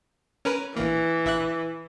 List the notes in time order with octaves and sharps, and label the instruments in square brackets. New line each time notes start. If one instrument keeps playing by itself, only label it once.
[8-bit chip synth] C#4 A#4 B4
[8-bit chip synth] A#1 A#3 [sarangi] E3
[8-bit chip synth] A#1 E5 F#6